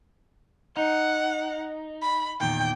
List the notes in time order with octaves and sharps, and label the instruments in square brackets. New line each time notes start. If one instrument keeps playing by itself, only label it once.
[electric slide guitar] D#4 [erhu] F#5
[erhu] B5
[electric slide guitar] E2 A#2 D#3 [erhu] G5